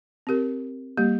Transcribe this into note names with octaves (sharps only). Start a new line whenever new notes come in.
C4 G4 A#4
G3 A#3 G4